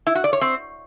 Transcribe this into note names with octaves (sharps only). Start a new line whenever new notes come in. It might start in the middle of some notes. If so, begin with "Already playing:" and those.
E4
F#4
D5
C#5
C4